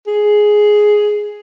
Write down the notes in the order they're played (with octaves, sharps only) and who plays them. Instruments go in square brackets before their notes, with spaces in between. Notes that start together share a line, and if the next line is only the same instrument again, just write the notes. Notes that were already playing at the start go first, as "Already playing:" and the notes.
[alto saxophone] G#4